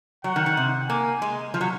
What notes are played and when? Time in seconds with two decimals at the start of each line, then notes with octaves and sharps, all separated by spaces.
0.24 F#3 F#5
0.36 D#3
0.46 D#3
0.57 C3
0.89 A#3 G#5
1.22 G#3
1.54 F3
1.61 F#3